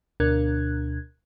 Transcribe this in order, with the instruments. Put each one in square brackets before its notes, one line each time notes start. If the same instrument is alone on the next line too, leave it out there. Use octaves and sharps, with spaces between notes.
[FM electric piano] D2 B2 D4 A#4 F#6 G#6